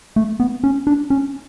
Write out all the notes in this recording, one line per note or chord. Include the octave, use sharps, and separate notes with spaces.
A3
B3
C#4
D4
C#4